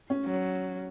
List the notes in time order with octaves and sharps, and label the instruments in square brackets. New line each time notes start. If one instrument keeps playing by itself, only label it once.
[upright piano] C#4
[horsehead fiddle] F#3